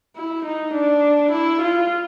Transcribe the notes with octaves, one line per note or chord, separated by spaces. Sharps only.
E4
D#4
D4
E4
F4